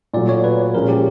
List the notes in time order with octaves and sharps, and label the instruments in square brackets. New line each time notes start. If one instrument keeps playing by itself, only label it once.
[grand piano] A#2 F#3 A3 [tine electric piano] D5
[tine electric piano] C#5
B4
[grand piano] A#2 F3 G#3 C#4 F4 [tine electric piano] A#4
[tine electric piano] G4